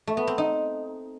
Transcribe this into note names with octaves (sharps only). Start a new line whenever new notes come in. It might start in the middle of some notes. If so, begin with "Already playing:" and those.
A3
B3
C4
D#4